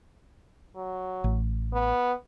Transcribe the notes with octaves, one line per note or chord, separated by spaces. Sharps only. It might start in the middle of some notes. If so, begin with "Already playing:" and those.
F#3
A1
B3